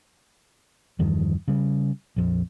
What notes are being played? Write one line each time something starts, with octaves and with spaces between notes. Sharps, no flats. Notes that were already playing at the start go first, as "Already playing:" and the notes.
E2 G2 D#3 F3
C#3 G3
A#1 F2